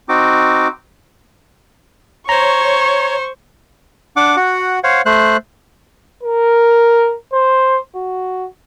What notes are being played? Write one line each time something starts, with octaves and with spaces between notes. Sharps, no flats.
C4 D#4 F#4 D6
C5 C#5 A#5 C#6
D4 F#5 D6
F#4 F#5
C5 C#5 F5 F#5
A3 C5 F#6
A#4
C5
F#4